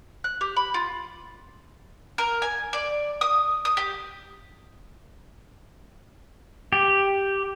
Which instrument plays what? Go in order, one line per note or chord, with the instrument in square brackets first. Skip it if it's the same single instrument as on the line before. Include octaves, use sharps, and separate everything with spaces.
[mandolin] F#6
G4
B5
F4
A#4
G#5
D5
D#6
D#6
G4
[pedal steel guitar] G4